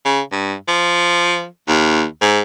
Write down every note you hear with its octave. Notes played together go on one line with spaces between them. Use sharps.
C#3
G2
F3
D#2
G#2